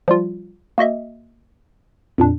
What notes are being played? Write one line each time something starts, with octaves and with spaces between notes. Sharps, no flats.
F3 G3 F4
A#3 F#4 D#5 E5
F2 A#2 D4